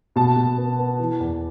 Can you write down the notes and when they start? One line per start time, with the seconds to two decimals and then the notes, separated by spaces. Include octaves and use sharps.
0.16 B2 A5
0.36 B2
0.57 B3
0.78 B3
0.99 E3
1.20 E2